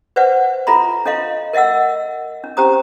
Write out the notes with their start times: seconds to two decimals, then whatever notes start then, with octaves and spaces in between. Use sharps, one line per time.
0.16 B4 C5 D5 E5 F#5
0.67 F4 A4 E5 A#5 B5
1.05 D4 A4 D#5 F5 C6
1.53 A#4 D#5 E5 F#5 E6
2.44 D4
2.57 C#4 G4 C5 A#5 D#6